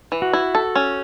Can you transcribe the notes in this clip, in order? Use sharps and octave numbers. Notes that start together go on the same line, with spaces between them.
E3
F#4
E4
A4
C#4